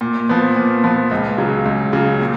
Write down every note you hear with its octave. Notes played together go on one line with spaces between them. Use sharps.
A#2
F3 B3
A#2
F3 B3
C#2
C#3 F#3
C#2
C#3 F#3
A#2